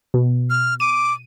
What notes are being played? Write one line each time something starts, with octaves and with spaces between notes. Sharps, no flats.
B2
F6
D6 D#7